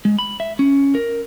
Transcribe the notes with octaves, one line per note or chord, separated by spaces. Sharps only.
G#3
B5
E5
C#4
A#4